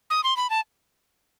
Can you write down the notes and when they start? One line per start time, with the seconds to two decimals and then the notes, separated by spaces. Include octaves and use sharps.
0.10 D#6
0.24 C6
0.37 B5
0.50 A5